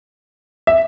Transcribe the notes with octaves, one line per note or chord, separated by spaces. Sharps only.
E5